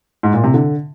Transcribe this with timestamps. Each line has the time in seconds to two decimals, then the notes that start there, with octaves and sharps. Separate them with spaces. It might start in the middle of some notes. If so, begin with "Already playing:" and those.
0.23 G#2
0.34 A#2
0.44 C3
0.54 D3